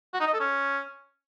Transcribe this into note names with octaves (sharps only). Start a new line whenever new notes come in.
F#4
D#4
D#5
A4
C#4